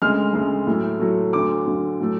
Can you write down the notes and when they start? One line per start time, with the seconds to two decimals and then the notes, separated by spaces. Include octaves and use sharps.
0.02 D2 C#3 G#3 F6
0.34 D2 C#3 G#3
0.67 A2 F#3 A3
1.00 A2 F#3 A3
1.33 D2 D3 F#3 D6
1.67 D2 D3 F#3
2.00 A2 F#3 A3